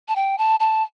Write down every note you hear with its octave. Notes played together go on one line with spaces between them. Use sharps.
A5
G5
A5
A5